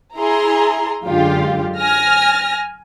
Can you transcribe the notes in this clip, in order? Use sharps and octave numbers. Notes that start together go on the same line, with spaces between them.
E4 G#4 A#5 C6
F#2 D3 G#3 F4 G4
G#5 F6 A#6